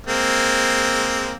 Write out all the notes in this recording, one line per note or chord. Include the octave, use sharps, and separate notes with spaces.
G#3 A#3 C4